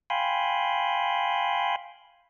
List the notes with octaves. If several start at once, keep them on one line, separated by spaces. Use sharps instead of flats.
F5 G5 G#5 B5 C6